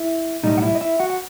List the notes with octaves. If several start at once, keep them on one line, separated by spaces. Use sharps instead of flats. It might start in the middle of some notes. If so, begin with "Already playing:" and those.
Already playing: E4 E5
B1 A2 G3 D#4 D#5
F#5
E4 E5
D#5
E4 E5
F#4 F#5
F#5